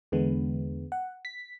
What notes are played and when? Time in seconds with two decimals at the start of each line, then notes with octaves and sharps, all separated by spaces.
0.12 E2 D3 G#3 B3
0.92 F#5
1.25 B6